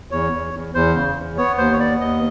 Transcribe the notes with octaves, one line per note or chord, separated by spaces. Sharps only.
E2 C#5
E2
E2
E2 C5
C#3
E2
B3 C#5
D#2 C5
C#5
B3 D5
D#2 D#5